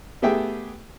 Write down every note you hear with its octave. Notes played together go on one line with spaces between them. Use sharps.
A3 B3 G4 G#4 E5 G5